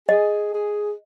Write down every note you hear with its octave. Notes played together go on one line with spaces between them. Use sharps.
G#4 D#5
G#4